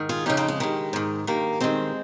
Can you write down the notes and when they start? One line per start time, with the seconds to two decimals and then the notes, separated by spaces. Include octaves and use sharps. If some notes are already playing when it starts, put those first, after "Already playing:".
Already playing: G#2 D#3
0.09 F4 G#4
0.26 F2 C#3 D#4 G4
0.37 C4 D#4
0.48 G#3
0.60 G2 D#3
0.93 G#2 D#3
1.27 G2 D#3 A#3
1.60 G2 D#3 G#3 C4